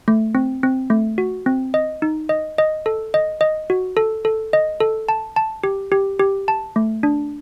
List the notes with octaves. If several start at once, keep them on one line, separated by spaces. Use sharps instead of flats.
A3
C4
C4
A3
F#4
C4
D#5
D#4
D#5
D#5
A4
D#5
D#5
F#4
A4
A4
D#5
A4
A5
A5
G4
G4
G4
A5
A3
D4